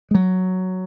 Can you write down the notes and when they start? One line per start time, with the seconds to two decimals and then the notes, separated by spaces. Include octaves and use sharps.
0.11 G#3
0.15 F#3